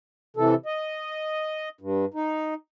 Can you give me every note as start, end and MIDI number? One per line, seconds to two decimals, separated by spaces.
0.37 0.55 48
0.37 0.55 52
0.37 0.55 69
0.66 1.69 75
1.81 2.05 43
2.14 2.54 63